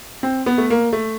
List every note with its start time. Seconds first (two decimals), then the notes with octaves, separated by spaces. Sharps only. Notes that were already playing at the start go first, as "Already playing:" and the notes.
0.23 C4
0.46 B3
0.58 A3
0.70 A#3
0.93 A3